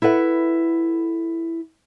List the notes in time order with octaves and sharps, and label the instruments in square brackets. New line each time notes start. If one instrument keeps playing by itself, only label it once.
[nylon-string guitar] E4 A4 B4 F#5